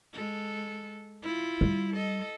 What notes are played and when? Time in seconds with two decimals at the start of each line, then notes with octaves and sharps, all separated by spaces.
0.14 G#3 A4
1.23 E4 F4
1.61 G3
1.94 A4 D#5